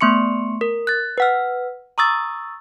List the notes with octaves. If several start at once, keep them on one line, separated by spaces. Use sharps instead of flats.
A3 B3 C6 C#6 C#7
A#4
F#6 A6
B4 F#5 F6
A#5 C#6 D#6 E6 A6